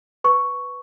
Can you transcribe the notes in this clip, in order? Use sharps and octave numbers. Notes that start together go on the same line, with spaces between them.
B4 C#6